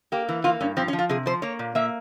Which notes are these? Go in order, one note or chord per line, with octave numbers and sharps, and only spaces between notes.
A#3 G4
E3
A#3 F4
G2 C#4
F3 C4
C#4
F3
F4
C3 G#4
F3 C5
A#3 C#5
A#2
A#3 E5